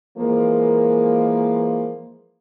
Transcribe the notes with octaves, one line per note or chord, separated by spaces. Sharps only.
E3 F3 G#3 A#3